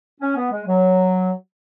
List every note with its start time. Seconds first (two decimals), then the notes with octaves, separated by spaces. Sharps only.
0.21 C#4
0.36 B3
0.51 G#3
0.66 F#3